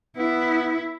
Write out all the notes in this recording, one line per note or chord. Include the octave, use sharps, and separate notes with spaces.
B3 E4